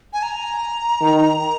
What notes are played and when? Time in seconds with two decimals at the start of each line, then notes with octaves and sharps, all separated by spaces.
0.13 G#5
0.23 A#5
1.01 D#3